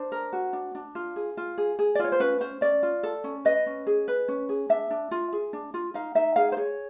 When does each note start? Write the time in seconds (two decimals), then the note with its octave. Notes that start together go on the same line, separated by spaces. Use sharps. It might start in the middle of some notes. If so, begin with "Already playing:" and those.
Already playing: D4 C5
0.12 A#4
0.33 F#4
0.53 D4
0.75 D4
0.95 F4
1.16 G#4
1.37 F4
1.58 G#4
1.79 G#4
1.95 D5
2.00 F4 C#5
2.12 C5
2.20 C#4 B4
2.40 C#4 C5
2.61 C#4 D5
2.83 F4
3.03 A4
3.24 C#4
3.45 B4 D#5
3.66 C#4
3.87 G#4
4.08 B4
4.28 C#4
4.49 G#4
4.69 D4 E5
4.91 D4
5.11 F4
5.33 G#4
5.53 D4
5.74 F4
5.94 D#4 F5
6.15 D#4 E5
6.36 G#4 F5
6.52 C5
6.57 G#4 C#5